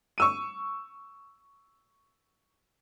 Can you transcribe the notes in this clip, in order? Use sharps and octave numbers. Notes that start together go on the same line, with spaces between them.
C#6 E6 D#7